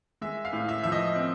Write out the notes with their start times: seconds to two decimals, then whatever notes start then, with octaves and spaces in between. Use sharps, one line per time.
0.21 G#3 E5
0.45 F5
0.53 A2
0.69 E5
0.83 F3 E5
0.92 D#5
1.16 C4